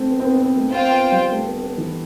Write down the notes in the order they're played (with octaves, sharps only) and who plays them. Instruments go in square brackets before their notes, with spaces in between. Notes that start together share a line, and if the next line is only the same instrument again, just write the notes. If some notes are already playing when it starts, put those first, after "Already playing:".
Already playing: [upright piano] A3 C4
B3
C4
B3
C4
A3
[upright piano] C4 [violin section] F4 C5 G5
[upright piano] B3
G3
A3
B3
B3
E3